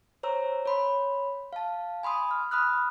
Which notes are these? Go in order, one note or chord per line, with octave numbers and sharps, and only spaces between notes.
C5 C#5 A#5 E6
C#5 B5 C6
F5 A5
G#5 B5 C6 D#6
F6
B5 D#6 F6 F#6